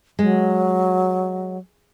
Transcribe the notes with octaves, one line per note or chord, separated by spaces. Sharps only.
F#3 G#3